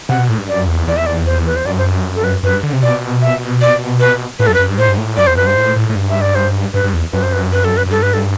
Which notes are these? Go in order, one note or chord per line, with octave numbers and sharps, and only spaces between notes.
C3 F#5
B2
A2
G2
F#2 D5
E2
E2 D5
E5
D5
C5
B4
C5
F#2 D5
C5
A4
B4
F#2 B4
G2
D3
C3
B2 D5
E5
D5
B4
A2 B4
F#2 A4
B4
F#2
G2
A2 C5
G2
A2
F#2 D5
E2 C5
F#2 B4
G2 C5
A2
A2
A2
G2
E5
D5
C5
G2 B4
G2
E2
F#2 B4
C5
B4
B4
A4
B4
F#2
G2 A4
B4
A4